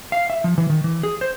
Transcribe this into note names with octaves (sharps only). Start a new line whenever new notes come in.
F5
E5
F3
E3
D#3
E3
G#4
C5